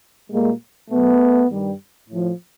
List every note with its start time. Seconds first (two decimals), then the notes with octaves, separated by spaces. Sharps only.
0.30 A#2 G3 G#3 A#3
0.90 B2 F#3 A3 B3
1.51 G2 D#3 G3
2.09 A2 F3